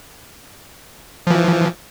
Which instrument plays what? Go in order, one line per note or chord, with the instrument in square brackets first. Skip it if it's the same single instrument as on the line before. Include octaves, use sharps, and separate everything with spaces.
[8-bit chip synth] E3 F3